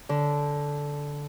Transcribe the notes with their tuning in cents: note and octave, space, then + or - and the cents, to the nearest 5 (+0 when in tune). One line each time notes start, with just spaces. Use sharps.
D3 -10